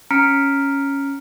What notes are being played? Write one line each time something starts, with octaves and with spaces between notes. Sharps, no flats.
C#4 A#5 F6 B6 C#7 D7